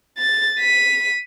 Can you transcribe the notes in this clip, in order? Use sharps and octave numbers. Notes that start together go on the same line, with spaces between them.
A6
B6 D#7